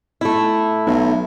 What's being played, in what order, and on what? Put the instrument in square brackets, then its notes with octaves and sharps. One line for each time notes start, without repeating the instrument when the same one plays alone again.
[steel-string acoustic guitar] A3 E4
[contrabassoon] B1